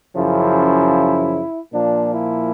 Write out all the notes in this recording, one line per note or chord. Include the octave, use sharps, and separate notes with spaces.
F#2 C#3 F3 E4
A#2 F3 A#3 D4
E4